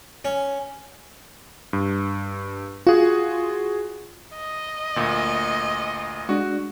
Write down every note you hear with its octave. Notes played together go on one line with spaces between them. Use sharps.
C#4
G2
F4 F#4 G#4
D#5
D2 A#2
G#3 D4 F#4